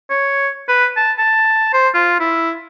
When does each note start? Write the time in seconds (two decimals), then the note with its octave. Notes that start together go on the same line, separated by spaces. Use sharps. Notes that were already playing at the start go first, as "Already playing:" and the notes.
0.10 C#5
0.68 B4
0.97 A5
1.19 A5
1.73 C5
1.94 F4
2.20 E4